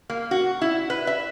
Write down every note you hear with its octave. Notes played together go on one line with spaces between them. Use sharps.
A#3
F#4
E4
B4
E5